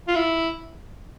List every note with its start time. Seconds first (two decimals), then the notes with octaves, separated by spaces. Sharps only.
0.08 F4
0.15 E4